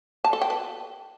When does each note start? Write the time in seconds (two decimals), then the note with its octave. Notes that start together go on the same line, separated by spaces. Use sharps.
0.24 A5
0.33 A4
0.41 G5
0.50 B4